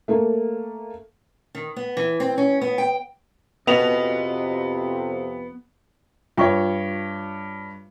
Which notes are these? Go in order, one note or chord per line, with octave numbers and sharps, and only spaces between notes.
A3 A#3 A4
D#3
B3
E3
C4
C#4
B3
G5
F2 C3 B3 F#4 D#5 F7
G2 F4 C#5 G5 C#6